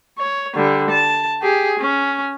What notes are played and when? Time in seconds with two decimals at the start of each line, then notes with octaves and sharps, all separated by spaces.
0.18 C#5
0.55 D3 G3
0.90 A5
1.42 G4 G#4
1.79 C#4